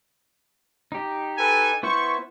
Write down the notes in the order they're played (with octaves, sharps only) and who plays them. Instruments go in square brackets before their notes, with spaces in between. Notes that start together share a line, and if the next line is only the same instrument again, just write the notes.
[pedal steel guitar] D#4 G4
[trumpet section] A4 B4 G#5
[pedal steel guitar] B3 E4 C5 [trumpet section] C#6